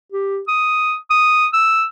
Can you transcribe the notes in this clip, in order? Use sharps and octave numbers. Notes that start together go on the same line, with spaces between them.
G4
D#6
D#6
E6